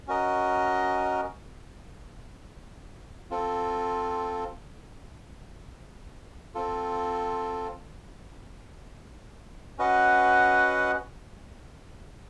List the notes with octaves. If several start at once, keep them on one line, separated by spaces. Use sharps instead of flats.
C#4 F#4 A#4 D#5
C4 F4 A4
C4 F4 A4
C#4 F#4 B4 D#5 F#5